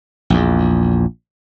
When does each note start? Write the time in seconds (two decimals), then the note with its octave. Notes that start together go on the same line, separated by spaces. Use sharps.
0.30 A#1 E2